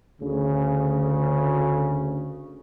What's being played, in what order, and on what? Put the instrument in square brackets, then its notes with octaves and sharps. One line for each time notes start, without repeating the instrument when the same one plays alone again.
[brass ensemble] D2 C#3